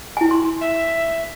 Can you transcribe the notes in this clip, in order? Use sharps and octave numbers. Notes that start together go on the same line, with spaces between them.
E4 G#5
C6
E5